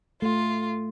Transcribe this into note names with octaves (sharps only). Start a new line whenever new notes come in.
A3 F4